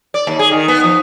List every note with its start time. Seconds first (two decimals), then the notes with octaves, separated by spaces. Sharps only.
0.14 D5
0.27 D#2
0.39 G#4
0.51 D#3
0.68 B3
0.84 F3